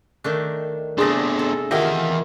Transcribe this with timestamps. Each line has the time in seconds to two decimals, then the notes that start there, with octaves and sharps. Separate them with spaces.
0.24 D#3 A3 D4
0.98 C3 A3 B3 D4 G#4 C6 D#6 A#6
1.39 A4
1.71 D#3 E3 F4 G4 D#5 E5 F#5